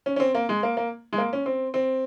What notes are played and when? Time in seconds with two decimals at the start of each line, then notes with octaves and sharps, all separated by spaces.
0.06 C#4
0.16 C#4
0.20 C4
0.35 A#3
0.49 G#3
0.63 A#3
0.77 A#3
1.13 G#3
1.18 A#3
1.33 C#4
1.46 C4
1.74 C4